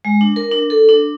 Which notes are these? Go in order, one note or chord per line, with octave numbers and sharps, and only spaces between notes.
G#3
D4
A#4
D4
A4
D4